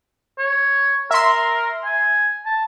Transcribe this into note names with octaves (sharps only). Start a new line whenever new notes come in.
C#5
A#4 E5 C6
G#5
A5